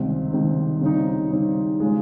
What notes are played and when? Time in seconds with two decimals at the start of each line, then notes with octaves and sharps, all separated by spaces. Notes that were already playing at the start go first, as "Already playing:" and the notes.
Already playing: C#2 C3 D#3 G3 C4
0.32 C#2 C3 D#3 G3 C4
0.81 C#3 G3 C4 D#4
1.31 C#3 G3 C4 D#4
1.80 C#3 F3 G#3